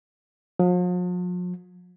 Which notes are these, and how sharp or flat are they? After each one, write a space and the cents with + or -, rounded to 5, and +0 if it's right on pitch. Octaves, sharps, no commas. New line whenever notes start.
F3 +45